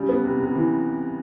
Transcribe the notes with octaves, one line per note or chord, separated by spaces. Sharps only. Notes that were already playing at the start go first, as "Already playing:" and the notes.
Already playing: C#3 G3
B3
C3
C3
E3